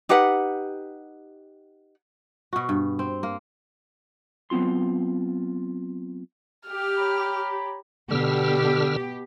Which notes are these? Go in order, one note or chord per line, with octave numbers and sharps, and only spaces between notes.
D#4 G4 B4 F#5
B2 F#4
G2
C4
A#3
F#3 B3 C4 F4 C6
G4 F6
C#5 A#5 B5
B2 D3 G4 E6 F6